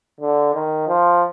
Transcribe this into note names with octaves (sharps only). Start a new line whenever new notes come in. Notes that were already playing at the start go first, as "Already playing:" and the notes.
D3
D#3
F3